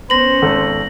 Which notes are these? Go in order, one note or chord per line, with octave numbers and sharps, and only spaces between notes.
B3 C#4 C5 A#6 F#7
G#1 A4